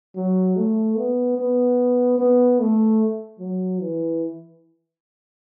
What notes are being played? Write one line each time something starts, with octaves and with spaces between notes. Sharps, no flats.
F#3
A3
B3
B3
B3
A3
F#3
E3